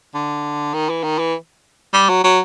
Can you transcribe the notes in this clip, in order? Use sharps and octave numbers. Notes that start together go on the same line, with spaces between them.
D3
D#3
E3
D#3
E3
G3
F#3
F#3